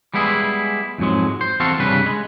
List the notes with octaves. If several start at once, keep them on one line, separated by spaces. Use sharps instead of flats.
G3 G#3 B3 E4 F#4 G#4
F2 G#2 F#3 G#3
C5
E2 C4 F#4 A4 F5
C2 G2 C#3 G3 B4
G#3